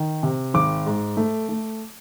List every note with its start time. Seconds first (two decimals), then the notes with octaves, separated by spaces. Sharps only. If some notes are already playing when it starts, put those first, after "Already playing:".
Already playing: D#3
0.23 C3
0.54 G#1 D6
0.86 G#2
1.17 A3
1.49 A3